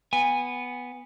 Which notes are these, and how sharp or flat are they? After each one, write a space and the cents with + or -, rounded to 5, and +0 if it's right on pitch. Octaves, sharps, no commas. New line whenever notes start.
B3 +0 G#5 -20